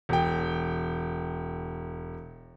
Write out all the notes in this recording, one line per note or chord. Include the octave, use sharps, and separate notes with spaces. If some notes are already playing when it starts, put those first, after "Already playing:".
E1 G5